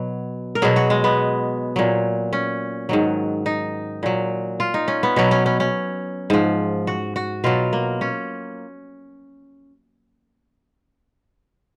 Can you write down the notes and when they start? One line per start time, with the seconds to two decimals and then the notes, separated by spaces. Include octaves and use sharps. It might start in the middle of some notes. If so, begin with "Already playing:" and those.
Already playing: B2 F#3
0.55 A#4
0.62 B2 F#3 G#4
0.76 F#4
0.90 G#3
1.04 B3
1.76 A#2 F#3
2.33 C#4
2.89 G#2 D#3 F#3
3.46 D#4
4.03 A#2 F#3
4.60 F4
4.74 D#4
4.88 C#4
5.03 B3
5.16 B2 F#3 C#4
5.31 C#4
5.46 C#4
5.60 C#4
6.30 G#2 F3
6.87 F#4
7.16 F#4
7.44 B2 F#3 F4
7.73 A#3
8.01 C#4